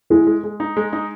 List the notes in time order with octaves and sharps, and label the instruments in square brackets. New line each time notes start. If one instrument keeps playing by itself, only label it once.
[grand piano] G#3 [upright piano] E4 G#4
[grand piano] G#3
G#3
D#4
G#3
D#4